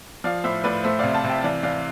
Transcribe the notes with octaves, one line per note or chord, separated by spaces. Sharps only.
F3 D5 F5
A2 C5 E5
A2 B4 D5
A3 C5 E5
C3 D5 F5
F5 A5
C3 E5 G5
E3 D5 F5
E3 D5 F5